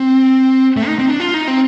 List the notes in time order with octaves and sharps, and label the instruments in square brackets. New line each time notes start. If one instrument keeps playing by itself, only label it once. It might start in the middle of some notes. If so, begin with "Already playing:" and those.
Already playing: [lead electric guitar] C4
A3
D#4
C4
D4
F4
D#4
C4